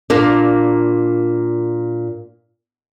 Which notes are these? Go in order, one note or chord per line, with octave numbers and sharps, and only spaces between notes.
A#2 A#3 D4